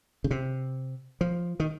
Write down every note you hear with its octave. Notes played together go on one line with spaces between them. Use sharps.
C#3
C3
F3
D#3